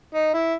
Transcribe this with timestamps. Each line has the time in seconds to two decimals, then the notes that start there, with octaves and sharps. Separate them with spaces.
0.15 D#4
0.34 E4